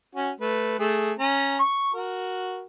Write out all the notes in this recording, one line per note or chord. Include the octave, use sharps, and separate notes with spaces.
C#4 F#4
A3 B4
A3 G#4
C#4 A#5
C#6
F#4 A#4